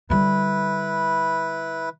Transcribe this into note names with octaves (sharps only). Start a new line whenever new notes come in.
D3 G3 E4 B4